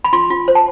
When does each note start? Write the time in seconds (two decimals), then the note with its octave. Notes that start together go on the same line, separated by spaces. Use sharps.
0.04 B5
0.13 F4 C6
0.30 F4
0.48 C5
0.55 A5